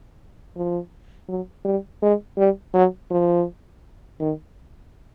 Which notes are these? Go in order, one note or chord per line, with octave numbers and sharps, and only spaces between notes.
F3
F#3
G3
G#3
G3
F#3
F3
D#3